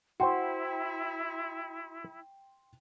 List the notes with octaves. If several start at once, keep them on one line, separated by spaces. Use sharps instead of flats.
E4 F#4 C5 G5 C6